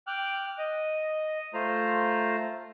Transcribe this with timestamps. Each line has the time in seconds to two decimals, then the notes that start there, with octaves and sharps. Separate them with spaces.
0.07 G5 D6 F6 F#6
0.58 D#5
1.54 A3 F4 C5 A#5